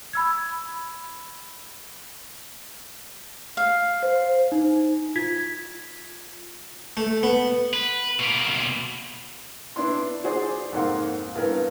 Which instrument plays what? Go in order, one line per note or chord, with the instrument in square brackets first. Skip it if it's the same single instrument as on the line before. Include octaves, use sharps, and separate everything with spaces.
[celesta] B5 E6 G#6
[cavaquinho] F5
[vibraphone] C5
[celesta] D#4
F4 G#6 B6
[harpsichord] A3
B3
[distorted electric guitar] B4
B2 A#3
[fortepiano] B3 D4 E4 C6
F#4 G#4 C5 D5
F2 G#2 A#3 F#5 C6
G2 E3 B3 A#4